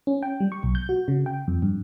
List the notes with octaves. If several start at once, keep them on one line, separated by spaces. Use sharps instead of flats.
C#4
G5
G3
C#6
B1
G6
F#4
C#3
G5
F2
G2